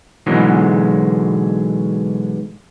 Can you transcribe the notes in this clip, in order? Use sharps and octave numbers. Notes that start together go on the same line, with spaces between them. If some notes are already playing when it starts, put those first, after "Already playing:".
G#2 B2 D3 E3 F#3 G#3